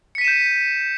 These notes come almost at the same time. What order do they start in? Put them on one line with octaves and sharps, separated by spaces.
C#7 B6 D#7 E7 G6